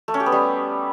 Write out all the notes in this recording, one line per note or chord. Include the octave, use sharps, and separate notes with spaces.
A3
C#4
G4
B3
G3